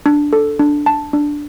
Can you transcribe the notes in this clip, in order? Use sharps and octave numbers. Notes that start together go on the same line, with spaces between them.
D4
A4
D4
A5
D4